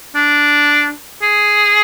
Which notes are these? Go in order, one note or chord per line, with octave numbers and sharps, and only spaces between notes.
D4
G#4